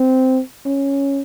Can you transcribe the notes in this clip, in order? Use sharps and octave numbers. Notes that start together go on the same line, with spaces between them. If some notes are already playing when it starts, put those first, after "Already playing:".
Already playing: C4
C#4